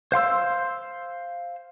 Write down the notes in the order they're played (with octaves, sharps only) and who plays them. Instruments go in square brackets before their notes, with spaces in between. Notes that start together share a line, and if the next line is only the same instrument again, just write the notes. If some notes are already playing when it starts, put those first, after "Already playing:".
[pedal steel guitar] C5 F5 C6 E6